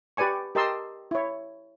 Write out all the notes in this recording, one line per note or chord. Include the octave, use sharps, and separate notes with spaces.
G4 B4 D5 G#5 C#6
G4 A#4 D#5 A5 C6 E6
E4 C#5